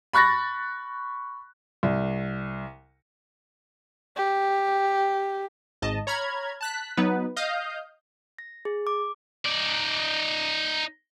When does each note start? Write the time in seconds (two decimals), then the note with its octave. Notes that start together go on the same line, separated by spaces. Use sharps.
0.13 B5 C#6 F#6 A6 A#6
1.83 C2
4.16 G4
5.82 G#1 G#2 D#5 A5
6.07 C#5 A#5 B5 F6 G#6
6.61 A5 F#6 B6
6.97 F#3 B3 D#4 B4
7.36 D#5 F5 D#6 F6 G6
8.39 A#6
8.65 G#4
8.87 D6
9.45 D#4 D5